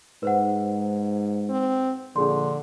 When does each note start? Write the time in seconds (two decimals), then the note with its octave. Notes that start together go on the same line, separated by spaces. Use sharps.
0.23 G#2 B4 C5 F#5
1.49 C4
2.16 A#1 D3 D4 G#4 C6